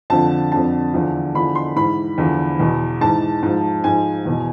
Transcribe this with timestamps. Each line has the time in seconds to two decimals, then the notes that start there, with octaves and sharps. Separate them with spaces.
0.10 F2 D3 F3 A5
0.52 F2 D3 F3 A5
0.93 E2 D3 F3
1.35 E2 D3 F3 B5
1.55 C6
1.76 G#2 E3 B5
2.18 E2 D3 F3
2.60 E2 B2
3.01 G#2 E3 A5
3.43 G#2 F3
3.84 G#2 F3 G#5
4.25 E2 B2